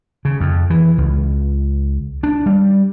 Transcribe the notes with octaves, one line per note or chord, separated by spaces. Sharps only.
C#3
F2
E3
C#2
D4
G3